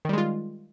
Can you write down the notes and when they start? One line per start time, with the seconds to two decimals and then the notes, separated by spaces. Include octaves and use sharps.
0.05 D#3
0.09 G3
0.13 G#3
0.18 F4